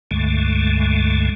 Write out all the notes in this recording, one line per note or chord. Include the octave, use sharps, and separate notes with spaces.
C#2 G2 D3 G#3 A3